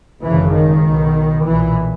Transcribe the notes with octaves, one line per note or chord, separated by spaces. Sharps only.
G#1 F#2 C#3 E3
D#3
B1 B2
B1 A#2 E3